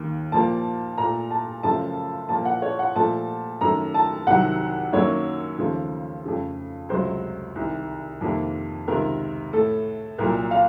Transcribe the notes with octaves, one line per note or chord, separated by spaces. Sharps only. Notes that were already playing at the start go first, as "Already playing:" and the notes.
Already playing: D#2 D#3 A#3
A#2 F3 A#3 A5
A#2 A3 A#5
A5
F#2 C#3 F3 A3 A5
A#2 F3 A#3 A5
F#5
C#5
F#5
A#2 F3 A3 A5
F#2 D#3 A3 A#5
A5
C2 C3 D#3 F#3 F#5
F#2 D#3 F#3 A#3 C#5
D#2 C#3 F3 A3
F2 C#3 A3
C#2 C3 F#3 A3 C5
C2 C3 D#3
F2 C3 D#3 A#3
C#2 C3 D#3 A#4
A2 A3 A4
C2 A#2 F#3 A#4
F5